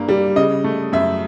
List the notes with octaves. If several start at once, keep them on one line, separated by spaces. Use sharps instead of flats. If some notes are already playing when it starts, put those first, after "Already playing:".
Already playing: G2 A#3
G3
C#3 D#5
A3
F#2 E5